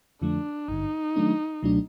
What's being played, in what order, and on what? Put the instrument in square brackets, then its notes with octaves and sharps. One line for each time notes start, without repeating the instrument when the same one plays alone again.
[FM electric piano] F2 D3 F3 A3 [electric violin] D4
[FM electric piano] G#1 G2 D3 [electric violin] D#4
[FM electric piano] D#3 F#3 A3 D4
C#2 B2 F#3 A3 D4